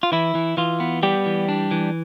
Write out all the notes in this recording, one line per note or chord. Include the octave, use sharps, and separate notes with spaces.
F4
E3 E4
E3
E3 F4
B3
G3 B3 G4
E3
D4
E3